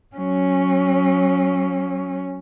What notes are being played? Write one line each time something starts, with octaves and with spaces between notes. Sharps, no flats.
F#3 C#4